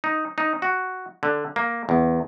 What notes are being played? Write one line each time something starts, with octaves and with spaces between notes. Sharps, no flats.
D#4
D#4
F#4
D3
A#3
E2